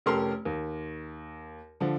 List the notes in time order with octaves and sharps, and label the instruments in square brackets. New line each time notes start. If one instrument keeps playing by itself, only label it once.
[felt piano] F1 C#4 G4 A4 A#4 C6
D#2
D3 F3